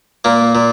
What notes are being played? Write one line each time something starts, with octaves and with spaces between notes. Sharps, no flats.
A#2 A#3
A#2